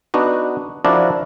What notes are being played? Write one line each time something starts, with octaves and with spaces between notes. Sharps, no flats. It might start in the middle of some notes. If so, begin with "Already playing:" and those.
B3 D4 D#4 F#4
F3 D4 E4 F#4 A#4 D5